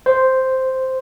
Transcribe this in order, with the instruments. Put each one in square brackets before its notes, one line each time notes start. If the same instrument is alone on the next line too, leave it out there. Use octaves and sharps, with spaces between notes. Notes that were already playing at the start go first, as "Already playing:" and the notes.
[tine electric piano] C5